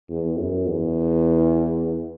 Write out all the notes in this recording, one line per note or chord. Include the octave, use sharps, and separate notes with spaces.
E2
F#2
E2